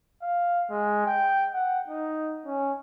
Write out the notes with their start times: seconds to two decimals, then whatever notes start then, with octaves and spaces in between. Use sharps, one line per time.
0.22 F5
0.70 G#3
1.06 G5
1.53 F#5
1.88 D#4
2.46 C#4